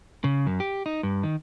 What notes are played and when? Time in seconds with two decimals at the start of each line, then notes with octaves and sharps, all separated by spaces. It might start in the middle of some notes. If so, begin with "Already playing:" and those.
0.24 C#3
0.47 F#2
0.60 G4
0.86 D#4
1.03 G2
1.23 D#3